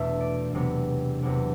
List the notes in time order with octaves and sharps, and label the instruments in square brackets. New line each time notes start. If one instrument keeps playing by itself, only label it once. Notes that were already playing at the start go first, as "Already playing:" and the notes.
Already playing: [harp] E2 B2 A3 D4 E5
D5
E2 C3 F#3 B3 D4
E2 C3 F#3 B3 D4